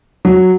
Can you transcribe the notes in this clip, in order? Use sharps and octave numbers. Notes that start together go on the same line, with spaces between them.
F#3